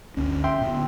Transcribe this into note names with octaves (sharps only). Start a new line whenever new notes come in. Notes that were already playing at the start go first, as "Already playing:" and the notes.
G1 D2 C#4
E5 G5 C6
A2 D3 B3